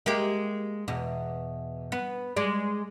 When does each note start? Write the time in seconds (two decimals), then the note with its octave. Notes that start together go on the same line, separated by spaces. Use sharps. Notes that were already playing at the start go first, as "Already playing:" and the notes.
0.06 G#3 A#3 G4
0.88 E2 B2
1.92 B3
2.36 G#3 D5